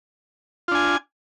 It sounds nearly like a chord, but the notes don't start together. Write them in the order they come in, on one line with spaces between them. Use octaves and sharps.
F4 D4 G#5